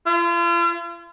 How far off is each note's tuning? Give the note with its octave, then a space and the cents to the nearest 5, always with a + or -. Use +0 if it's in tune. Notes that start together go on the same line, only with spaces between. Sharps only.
F4 -40